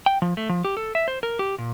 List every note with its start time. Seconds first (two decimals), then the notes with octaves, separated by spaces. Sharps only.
0.06 G5
0.22 F3
0.37 A3
0.49 F3
0.65 G4
0.77 A4
0.95 E5
1.08 C5
1.23 A#4
1.39 G4
1.58 A#2